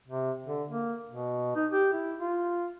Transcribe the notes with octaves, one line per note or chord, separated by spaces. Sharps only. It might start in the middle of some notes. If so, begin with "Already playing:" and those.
C3
D3
A#3
B2
D#4
G4
E4
F4